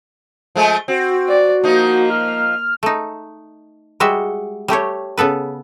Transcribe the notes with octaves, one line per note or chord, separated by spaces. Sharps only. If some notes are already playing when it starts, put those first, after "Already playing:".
F3 G#3 A3
C4 F#4
D5
F3 A#3 D#4
F6
A3 D#4
G3 G#3 F#4 E5
G3 A3 G4 C#5
C#3 B3 A4 B4